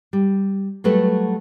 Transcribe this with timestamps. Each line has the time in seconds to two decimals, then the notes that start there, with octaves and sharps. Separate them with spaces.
0.13 G3
0.84 F#3 G3 A3 F#4 A4 B4